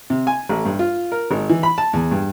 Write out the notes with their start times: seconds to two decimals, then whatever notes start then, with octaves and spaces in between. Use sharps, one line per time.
0.10 C3
0.27 G#5
0.49 A1
0.65 G2
0.79 F4
1.12 A#4
1.31 G#1
1.49 E3
1.63 B5
1.78 A5
1.93 E2
2.11 G2